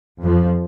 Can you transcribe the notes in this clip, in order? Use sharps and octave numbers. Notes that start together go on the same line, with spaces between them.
F2 F3